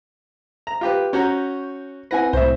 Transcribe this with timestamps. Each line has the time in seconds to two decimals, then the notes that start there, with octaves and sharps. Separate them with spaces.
0.67 A#5
0.81 F4 G4 B4
1.13 C#4 F#4 A#5 C#6 G6
2.11 C4 E4 B4 F#5 G#5 A#6
2.33 C2 A2 C5 E5